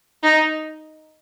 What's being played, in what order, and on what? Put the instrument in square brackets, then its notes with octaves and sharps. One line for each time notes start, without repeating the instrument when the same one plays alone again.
[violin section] D#4